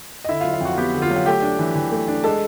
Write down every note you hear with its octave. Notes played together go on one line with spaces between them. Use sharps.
D#5
D3 E4 E5
F#3 F4 F5
F4 F5
F2 F#4 F#5
B3 G4 G5
D3
F4 F5
F#3 F#5
A3 G4 G5
D4
E3
E3
A3
D4
G#3 A4 A5